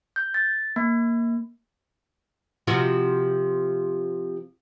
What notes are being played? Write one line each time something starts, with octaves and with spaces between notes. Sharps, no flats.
G6
A6
A#3
C3 F3 F#4